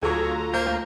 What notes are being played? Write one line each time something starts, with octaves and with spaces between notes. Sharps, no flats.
D2 F#3 F4 G#4 A4 A#5 C#6
A#3 C5 G6
A3